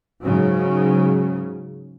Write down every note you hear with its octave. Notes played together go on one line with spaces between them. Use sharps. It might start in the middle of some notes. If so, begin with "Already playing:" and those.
G#2 C#3 F#3